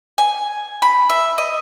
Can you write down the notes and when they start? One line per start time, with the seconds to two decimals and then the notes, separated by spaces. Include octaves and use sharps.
0.18 G#5
0.82 B5
1.10 E5
1.38 D#5